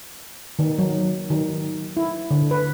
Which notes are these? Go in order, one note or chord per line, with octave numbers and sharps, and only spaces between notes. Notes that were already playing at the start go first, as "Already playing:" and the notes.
D#3
F#3
D#3
E4
D3
B4